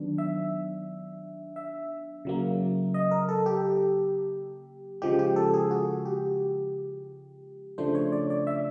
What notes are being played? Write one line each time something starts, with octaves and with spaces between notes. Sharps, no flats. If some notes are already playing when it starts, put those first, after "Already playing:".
Already playing: D#3 F#3 B3 D4
E5
E5
C#3 F#3 A#3
D#5
A#4
A4
G4
C#3 F3 G#3 G4
G4
A4
G#4
F#4
G4
C#3 F3 A3 D4 C5
C#5
D5
D5
E5